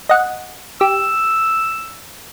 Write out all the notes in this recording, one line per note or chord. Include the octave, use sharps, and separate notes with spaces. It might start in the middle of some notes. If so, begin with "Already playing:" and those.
D#5 F#5
G4 E6